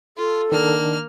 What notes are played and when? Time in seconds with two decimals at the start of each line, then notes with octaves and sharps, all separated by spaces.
0.17 F4 A4
0.52 D#3 A#3 D4 F6